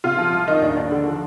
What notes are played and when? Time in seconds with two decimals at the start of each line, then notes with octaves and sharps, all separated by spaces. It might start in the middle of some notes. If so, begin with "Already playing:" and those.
0.04 C3 F4
0.18 F3
0.33 C2
0.48 D#3 D#4
0.62 D#2 D4
0.77 D#2 D4
0.92 D3
1.06 F3